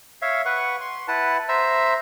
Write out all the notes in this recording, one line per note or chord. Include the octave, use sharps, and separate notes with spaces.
C#5 E5 F5
B4 F#5 C#6
C6
E4 B4 F#5 A5
C5 E5 A#5 E6